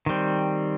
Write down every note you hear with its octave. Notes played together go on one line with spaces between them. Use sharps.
D#3 G3 C4